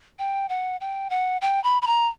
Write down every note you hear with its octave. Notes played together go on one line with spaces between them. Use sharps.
G5
F#5
G5
F#5
G5
B5
B5
A#5